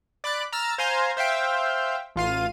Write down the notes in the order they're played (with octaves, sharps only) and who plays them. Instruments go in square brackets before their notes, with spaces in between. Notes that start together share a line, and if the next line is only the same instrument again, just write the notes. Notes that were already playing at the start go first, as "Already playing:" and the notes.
[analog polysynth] D5 B5 D6 F#6
A#5 E6 F6 A6
C5 F5 G#5 A#5 C6
C5 E5 F5 G5
A1 F4 F5 D#7